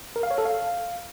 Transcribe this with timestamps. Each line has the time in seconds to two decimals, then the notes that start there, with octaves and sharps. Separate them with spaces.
0.16 A#4
0.23 F5
0.31 C#5
0.38 A4
0.45 F5